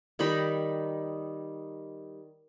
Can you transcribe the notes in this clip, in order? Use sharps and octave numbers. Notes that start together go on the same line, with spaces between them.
D#3 G3 D#4 B5